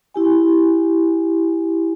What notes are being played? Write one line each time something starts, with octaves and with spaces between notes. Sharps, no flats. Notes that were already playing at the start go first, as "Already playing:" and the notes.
E4 G4 G#5